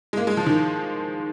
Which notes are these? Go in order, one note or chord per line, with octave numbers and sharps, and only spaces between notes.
G#3
A#3
G#3
F3
D#3